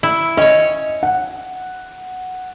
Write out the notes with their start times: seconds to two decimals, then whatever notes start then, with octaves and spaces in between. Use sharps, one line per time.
0.03 E4
0.37 C#4 C#5 D#5
1.03 F#5